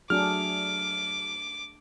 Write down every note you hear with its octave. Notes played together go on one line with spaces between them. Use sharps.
F#3 A3 D4 G#4 D6 F6